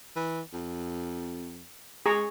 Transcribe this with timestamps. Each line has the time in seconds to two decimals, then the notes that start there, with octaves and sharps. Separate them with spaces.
0.16 E3
0.53 F2
2.06 G#3 G#4 A#5 C#6